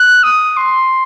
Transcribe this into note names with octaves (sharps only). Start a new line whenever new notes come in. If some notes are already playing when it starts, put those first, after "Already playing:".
Already playing: F#6
D#6
C6